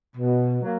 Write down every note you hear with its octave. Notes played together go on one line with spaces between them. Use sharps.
B2
F#3 A#3